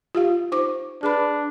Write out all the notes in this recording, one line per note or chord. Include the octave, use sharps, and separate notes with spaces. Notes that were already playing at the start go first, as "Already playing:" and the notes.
F4 G4 F5
D#4 C5 D6
D4 G#4 B4 B5